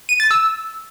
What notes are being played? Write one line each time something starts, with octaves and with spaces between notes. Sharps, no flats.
D#7
A6
E6